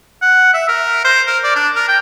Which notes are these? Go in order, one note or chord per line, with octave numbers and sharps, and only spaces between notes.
F#5
E5
A#4
C5
A#4
D5
D4
A#4
G5